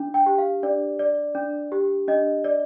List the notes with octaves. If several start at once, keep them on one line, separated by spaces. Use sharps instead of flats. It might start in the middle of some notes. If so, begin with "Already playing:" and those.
Already playing: D4
G5
G4
F5
D4 D5
D5
D4
G4
D4 D#5
D5